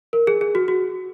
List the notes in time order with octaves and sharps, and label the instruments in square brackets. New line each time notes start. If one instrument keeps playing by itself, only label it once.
[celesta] A#4
G#4
G#4
F#4
F#4